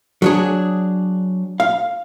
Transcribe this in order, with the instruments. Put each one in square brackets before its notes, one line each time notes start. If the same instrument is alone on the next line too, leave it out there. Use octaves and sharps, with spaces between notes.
[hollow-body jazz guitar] F#3 D4 G#4
F5